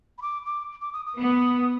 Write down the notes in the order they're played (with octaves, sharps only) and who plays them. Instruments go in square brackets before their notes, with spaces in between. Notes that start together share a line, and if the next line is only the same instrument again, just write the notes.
[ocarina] B5
D6
D6
D6
D#6
D#6
[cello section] B3